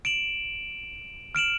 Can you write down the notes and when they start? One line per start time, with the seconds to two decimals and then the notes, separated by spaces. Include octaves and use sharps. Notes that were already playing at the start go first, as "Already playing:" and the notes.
0.05 D7 E7 F#7
1.35 F6 D7 E7 F#7